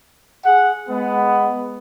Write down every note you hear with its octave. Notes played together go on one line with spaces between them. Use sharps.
G#4 F#5
G#3 B3